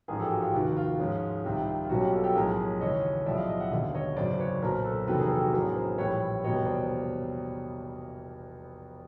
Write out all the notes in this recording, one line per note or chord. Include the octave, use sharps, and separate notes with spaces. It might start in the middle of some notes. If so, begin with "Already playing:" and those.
A1 G#2 F3 G#4 A#4
G4 A4
F#4 G#4
F4 G4
F1 D#2 D#3 F#4
F4
G#2 F3 G#3 C#4
C2 C3 D#3
F4
B1 B2 G3 A#3 C#4 F#4
F4 G4
G4 A4
G4 A4
B1 A2 F3 G#3 C#4 G#4 A#4
D#2 C#3 E3 G#3 C#4 C#5 D#5
B1 A2 F3 G#3 D5 E5
D#5 F5
D#5 F5
E5 F#5
E1 D#2 D3 D#5 F5
C#5 D#5
G#1 F#2 C#3 C5 D5
B4 C#5
B1 A#2 F#3 A#4 C5
A4 B4
F1 E2 C3 D#3 F#3 A4 B4
G#4 A#4
G4 A4
F#4 G#4
A1 A2 F#3 B3 D4 G#4 A#4
A#4 C5
A#1 A2 E3 G3 B4 C#5
F1 E2 B2 G3 A#3 C#5 D#5
C5 D5